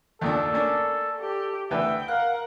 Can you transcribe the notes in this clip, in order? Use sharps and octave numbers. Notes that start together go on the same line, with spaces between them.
D#2 A#2 D4 A4
A#3 C#4 D4
G4 A4
D2 E3 B4 E5 G5
A#4 F5 F#5 F#6